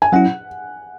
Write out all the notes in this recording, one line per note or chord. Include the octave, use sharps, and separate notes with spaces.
G#5
F#3 C#4 E4 F#5